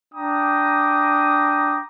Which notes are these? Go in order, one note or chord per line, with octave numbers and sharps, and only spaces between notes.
D4 G5 A#5 D6 D#6